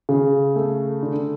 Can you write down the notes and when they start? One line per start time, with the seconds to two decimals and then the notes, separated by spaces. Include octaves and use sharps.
0.09 C#3
0.56 A3
1.03 D3